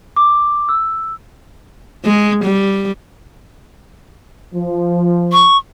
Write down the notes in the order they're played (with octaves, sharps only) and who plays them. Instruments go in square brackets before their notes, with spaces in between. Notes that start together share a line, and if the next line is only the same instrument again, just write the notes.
[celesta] D6
E6
[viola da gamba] G#3
G3
[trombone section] F3
[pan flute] C#6